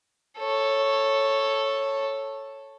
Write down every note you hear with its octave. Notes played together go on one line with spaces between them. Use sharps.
A4 C#5